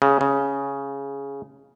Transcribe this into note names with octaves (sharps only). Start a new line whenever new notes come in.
C#3
C#3